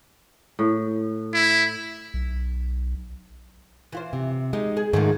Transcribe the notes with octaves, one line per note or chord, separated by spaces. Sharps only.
A2
E4
B1
E3 F4 C5
C3
G#3 D#4 G4
G#4
G#2 D#3 F3 F#3 A3 G#4